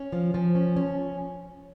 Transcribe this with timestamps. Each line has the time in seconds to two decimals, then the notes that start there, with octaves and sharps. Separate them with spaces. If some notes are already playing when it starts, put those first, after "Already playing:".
Already playing: C#4
0.13 F3
0.34 F3
0.55 C#4
0.76 C#4